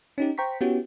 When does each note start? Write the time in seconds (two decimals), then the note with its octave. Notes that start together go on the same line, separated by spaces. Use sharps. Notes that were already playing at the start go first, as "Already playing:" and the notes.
0.18 C#4 D#4 G4
0.38 C5 G5 A#5 C#6 B6
0.61 B3 C#4 E4 F#4 G4